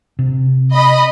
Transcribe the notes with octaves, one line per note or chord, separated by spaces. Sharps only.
C3
D#5 B5